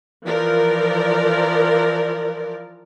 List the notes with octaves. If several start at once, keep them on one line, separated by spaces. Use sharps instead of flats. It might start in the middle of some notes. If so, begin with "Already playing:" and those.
E3 F3 A#4 D5